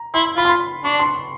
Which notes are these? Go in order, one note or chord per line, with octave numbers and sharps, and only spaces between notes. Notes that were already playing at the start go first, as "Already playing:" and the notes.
Already playing: A#5
E4 C6
F4 B5
C6
B5
D4 C#6
C6